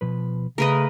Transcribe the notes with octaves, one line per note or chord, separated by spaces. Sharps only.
B2 F3 B4
C#3 A3 A#4 B4 D#5